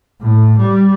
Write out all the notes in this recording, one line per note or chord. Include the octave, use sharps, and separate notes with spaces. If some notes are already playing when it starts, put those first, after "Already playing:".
A2
G3